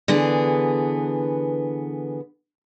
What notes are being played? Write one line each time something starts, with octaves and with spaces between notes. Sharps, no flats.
D3 E3 B3 G#4